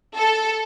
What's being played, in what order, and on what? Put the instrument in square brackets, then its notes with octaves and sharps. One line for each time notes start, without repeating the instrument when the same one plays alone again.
[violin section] A4